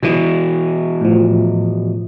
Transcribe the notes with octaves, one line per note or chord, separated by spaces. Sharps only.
B2 E3
A2 F3